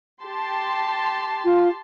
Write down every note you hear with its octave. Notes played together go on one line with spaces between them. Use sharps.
G4 A5 C6
F4